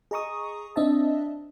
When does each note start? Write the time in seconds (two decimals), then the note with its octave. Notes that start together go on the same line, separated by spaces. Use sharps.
0.11 G#4 D#5 A#5 C#6 D#6
0.76 C4 D4 D#5 E5 A5